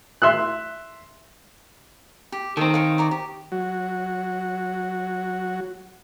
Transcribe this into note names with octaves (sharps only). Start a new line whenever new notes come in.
E5 C6 E6 F#6
G4
D#3 C4 A4 F5 A#5
A#4 C#5 F5
D5 A#5 C#6
G4
F#3 F#4